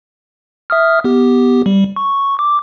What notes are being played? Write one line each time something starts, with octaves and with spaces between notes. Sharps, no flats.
E5 D#6 F6
B3 G4
G3
C#6
D6